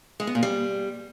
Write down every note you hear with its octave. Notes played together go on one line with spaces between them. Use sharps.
G#3
B3
A#2
G3